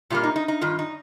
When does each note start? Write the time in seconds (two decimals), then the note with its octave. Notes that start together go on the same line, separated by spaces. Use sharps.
0.10 A#2 G3 A#3 F4
0.23 D#4
0.36 D#4
0.48 D#4
0.61 G2 D#3 F4
0.79 D#4